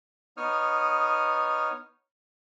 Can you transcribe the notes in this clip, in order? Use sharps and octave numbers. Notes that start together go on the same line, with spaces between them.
B3 D#4 C#5 D#6 F6